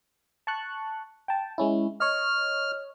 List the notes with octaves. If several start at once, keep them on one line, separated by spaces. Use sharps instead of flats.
A5 C#6 F#6
G5 A5
G#3 C#4 E4
C#5 D#5 F6